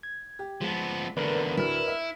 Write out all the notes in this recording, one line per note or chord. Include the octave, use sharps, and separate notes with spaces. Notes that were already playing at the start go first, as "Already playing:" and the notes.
G#6
G4
F3 G#3 B3
E2 D3 A#4 B4 D5
D2 A2 E4 F6
E5